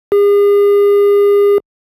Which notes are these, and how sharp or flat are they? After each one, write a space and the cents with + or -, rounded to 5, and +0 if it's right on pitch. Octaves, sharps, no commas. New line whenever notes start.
G#4 -40